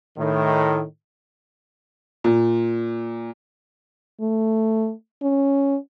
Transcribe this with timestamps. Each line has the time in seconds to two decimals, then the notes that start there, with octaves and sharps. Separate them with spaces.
0.17 A2 D#3
2.24 A#2
4.21 A3
5.23 C#4